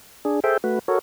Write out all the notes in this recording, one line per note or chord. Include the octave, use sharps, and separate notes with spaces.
D4 G#4
G#4 A4 C5 E5 G5
A3 F#4 B4
F#4 A4 A#4 C#5